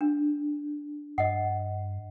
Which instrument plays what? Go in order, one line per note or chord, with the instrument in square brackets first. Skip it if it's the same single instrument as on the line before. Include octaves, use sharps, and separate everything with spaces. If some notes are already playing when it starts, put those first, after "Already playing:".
[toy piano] D4
[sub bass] G2 [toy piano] D#5 F#5